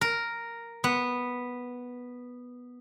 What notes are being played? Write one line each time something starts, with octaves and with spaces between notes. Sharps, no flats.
A#4
B3